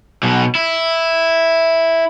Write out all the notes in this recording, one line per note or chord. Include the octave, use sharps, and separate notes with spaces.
B1 B2
E4